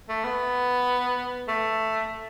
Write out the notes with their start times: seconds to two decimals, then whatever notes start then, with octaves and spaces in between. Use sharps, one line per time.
0.09 A3
0.24 B3
1.48 A3